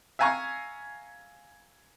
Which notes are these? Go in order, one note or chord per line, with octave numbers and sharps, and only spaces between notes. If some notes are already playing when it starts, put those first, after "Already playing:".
E5 F5 G#5 A#5 C#6